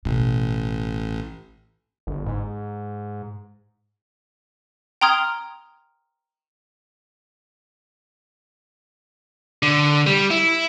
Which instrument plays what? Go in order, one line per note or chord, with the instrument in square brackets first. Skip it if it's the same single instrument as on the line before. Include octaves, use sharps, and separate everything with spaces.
[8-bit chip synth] A1 [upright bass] B2
[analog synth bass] G1
G#2
[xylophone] G5 A#5 C6 D#6 F6 G#6
[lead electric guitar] D3
G3
E4